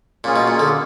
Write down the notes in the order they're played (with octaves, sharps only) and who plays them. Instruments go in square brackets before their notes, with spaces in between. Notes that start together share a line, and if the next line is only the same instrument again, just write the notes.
[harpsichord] A#2 [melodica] A#3 C#4 F4 G#4
[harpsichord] B2
A#2
D3